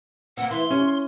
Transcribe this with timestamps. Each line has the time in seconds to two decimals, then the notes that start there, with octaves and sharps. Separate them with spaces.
0.37 A#3 C4 F#5
0.50 E3 C6
0.71 C#4 C#5